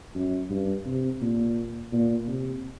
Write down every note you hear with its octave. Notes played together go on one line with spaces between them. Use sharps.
F#2
G2
C3
A#2
A#2
C3